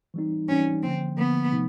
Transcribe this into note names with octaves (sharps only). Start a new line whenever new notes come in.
E3 G3 C4 D#4
E3 G3 C4 C#4 D#4
D3 F3 A#3 C4
D3 F3 A#3 B3
C3 F3 A3 C4 D#4